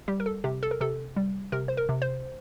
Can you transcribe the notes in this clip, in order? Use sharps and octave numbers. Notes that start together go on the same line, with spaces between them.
G3 G4
A#4
A4
C3 G4
A4
A#4
C3 A4
G3
C3 A#4
C5
A#4
C3
C5